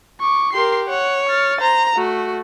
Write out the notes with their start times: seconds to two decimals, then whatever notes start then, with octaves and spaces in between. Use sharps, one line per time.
0.21 C#6 D6
0.53 G4 A#4 C6 C7
0.89 C#5 F#5
1.29 F6 A6
1.61 C5 A#5
1.96 A3 F#4